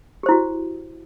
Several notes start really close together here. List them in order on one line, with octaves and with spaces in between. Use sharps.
G4 C5 E4 F#4